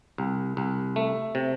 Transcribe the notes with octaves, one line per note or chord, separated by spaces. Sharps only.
C2
C2
A3
C3